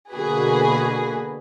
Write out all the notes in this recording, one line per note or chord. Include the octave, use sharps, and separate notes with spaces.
B2 D3 A#3 F#4 G#4 B4